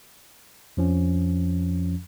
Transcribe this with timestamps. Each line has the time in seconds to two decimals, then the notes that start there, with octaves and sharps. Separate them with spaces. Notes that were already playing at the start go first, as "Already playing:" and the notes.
0.77 F2 F3 C#4